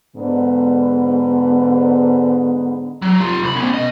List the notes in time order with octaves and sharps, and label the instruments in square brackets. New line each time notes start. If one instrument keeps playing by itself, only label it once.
[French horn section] G#2 D3 B3
[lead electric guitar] F#3
F4 G4
C2 B5
B3 C#4
B2 D#5